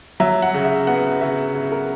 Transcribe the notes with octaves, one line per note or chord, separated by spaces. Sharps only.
F#3 E5
F#5
C#3
E5
B3 F#5
C#3 E5
C#3
A#4